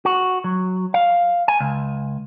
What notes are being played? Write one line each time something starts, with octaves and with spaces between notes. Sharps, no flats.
F#4
F#3
F5
G#5
C#2